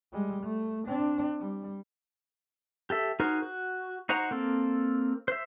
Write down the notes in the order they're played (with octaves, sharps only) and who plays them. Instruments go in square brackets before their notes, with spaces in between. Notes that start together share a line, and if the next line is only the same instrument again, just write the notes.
[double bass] G3 G#3
A3
C4 D4
G3
[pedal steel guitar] G4 A4 E5
D#4 F#4 G#4 A#4 C5
F#4
D#4 F#4 C5 F#5 A#5
A#3 C4 A4
C5 E5